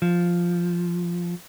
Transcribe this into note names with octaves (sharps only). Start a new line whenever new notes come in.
F3